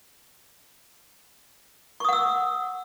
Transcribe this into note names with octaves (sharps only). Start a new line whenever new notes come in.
F#5 C#6 D#6 E6